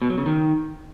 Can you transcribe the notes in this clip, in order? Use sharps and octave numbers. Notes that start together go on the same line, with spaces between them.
B2
F#3
C#3
D#3